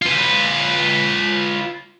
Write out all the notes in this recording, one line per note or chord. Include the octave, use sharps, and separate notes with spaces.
F4 B4